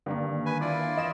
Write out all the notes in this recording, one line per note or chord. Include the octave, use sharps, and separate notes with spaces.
G2 D3 D#3 A#3
B4 G#5
D4 E4 F4 D5
E3 D#5 E7